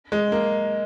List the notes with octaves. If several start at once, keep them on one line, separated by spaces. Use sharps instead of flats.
G#3
A#3